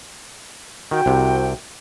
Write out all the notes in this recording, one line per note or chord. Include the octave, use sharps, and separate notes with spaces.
D#3 F#4 G5
C2 C3